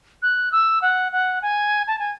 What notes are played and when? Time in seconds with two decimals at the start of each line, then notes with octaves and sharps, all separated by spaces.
0.22 F#6
0.52 E6
0.82 F#5
1.12 F#5
1.42 G#5
1.87 A5
1.99 G#5